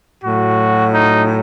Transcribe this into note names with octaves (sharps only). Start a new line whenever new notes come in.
A2 F#3 F#4
D#4